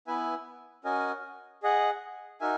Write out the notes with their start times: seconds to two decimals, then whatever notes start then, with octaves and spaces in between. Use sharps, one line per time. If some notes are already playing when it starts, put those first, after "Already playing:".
0.07 B3 E4 B4 E5 G#5
0.84 C#4 F#4 A#4 D#5 G#5
1.63 G#4 D#5 F#5
2.40 D#4 F#4 A#4 E5 G#5